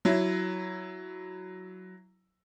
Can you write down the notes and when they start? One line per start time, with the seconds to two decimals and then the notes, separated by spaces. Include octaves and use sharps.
0.05 F#3 E4